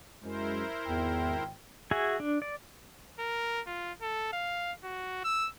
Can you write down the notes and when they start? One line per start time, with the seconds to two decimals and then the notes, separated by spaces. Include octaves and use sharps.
0.24 F#2 G#3 E4 A#4 C5
0.87 G#1 E2 G5
1.91 F#4 G#4 E5 G#5
2.20 D4
2.42 D5
3.19 A#4
3.67 F4
4.02 A4
4.33 F5
4.84 F#4
5.24 E6